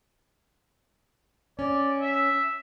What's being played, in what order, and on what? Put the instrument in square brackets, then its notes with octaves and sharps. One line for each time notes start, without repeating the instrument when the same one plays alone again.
[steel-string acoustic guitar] C#4 [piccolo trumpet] D5
[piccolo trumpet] E5